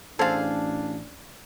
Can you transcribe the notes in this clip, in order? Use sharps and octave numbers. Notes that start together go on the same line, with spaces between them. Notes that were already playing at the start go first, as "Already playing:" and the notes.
A1 D4 G#4 A4 C5 F5 A5